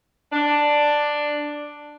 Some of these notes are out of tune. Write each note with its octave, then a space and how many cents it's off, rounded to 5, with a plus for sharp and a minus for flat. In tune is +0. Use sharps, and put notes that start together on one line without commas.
D4 +5